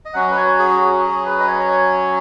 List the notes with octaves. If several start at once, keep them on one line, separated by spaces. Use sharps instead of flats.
D#5
F#3 C#4 F#4 F#5
B4
C#5
G#4
F#4
G#4
B4
D#5
C#5